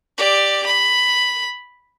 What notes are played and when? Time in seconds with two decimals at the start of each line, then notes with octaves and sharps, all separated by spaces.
0.18 G4 D5
0.66 B5